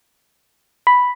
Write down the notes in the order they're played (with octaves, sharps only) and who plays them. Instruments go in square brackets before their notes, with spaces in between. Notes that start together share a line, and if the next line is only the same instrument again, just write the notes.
[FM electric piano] B5